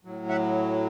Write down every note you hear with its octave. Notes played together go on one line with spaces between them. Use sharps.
A2 F#3
E5 F#5